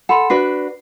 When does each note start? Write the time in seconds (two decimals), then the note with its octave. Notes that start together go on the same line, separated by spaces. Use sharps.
0.09 A4 F#5 B5 C6
0.30 D4 F#4 B4 C7